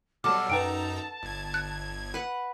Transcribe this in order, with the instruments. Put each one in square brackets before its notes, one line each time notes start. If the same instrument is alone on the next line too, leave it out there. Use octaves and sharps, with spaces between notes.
[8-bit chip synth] B2 F#3 G3 [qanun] A4 F#5 [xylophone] A5 D6 [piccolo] F6
[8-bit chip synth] F#2 D#4 A#5 [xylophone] B4 G5 D7 [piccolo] A5
[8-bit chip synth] G1 G#6
[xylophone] F#6
[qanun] B4 F#5